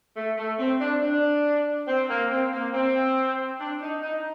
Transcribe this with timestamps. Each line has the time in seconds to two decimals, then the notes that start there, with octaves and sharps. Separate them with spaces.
0.16 A3
0.37 A3
0.59 C4
0.80 D4
1.01 D4
1.87 C4
2.09 A#3
2.31 C4
2.52 A#3
2.73 C4
3.59 D4
3.82 D#4
4.02 D#4